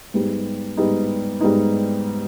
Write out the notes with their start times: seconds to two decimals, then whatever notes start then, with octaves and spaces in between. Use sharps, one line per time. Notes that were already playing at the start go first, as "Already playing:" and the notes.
0.14 G#2 G3 B3 D#4
0.77 G#2 G3 B3 D#4
1.41 G#2 G3 B3 D#4